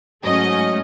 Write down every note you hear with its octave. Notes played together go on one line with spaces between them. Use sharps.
G#2 F#3 A3 C#4 D#5